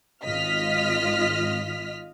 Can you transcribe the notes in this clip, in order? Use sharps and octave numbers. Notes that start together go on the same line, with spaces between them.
G#1 F4 D#5 F6 B6